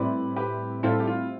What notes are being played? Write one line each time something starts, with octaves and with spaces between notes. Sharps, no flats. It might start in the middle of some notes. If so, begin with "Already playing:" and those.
Already playing: A2 G3 C4 E4 B4 D5
G4 B4
A2 G3 C4 E4 F4 A4
G4
F4